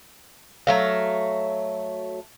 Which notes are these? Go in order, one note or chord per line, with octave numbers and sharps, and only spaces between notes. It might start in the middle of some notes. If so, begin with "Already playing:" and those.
F#3 A3 F5